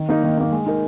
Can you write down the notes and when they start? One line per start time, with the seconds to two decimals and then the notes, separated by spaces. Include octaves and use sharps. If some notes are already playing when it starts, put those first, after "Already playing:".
Already playing: D#3
0.09 A#3 D#4
0.23 D#3
0.37 A#3 D#4
0.52 G#3
0.66 D#4 A#4